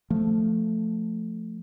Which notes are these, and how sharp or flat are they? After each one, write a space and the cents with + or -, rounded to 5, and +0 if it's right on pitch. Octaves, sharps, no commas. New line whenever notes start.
F3 +0 A3 +0